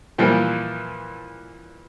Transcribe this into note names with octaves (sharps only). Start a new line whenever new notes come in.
A#2 E3 F3 G3 A#3